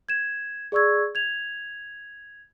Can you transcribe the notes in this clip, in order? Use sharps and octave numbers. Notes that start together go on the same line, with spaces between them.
G#6 E7
G#4 D5 C#6 E6 G#6
G#6 F7